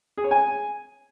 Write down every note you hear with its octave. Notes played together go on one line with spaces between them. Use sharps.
G#4
C#5
G#5